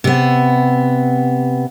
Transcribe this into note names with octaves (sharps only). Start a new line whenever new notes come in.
C3 B3